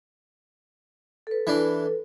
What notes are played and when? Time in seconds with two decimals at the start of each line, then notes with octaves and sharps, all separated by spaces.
1.27 A4 B4
1.47 E3 D4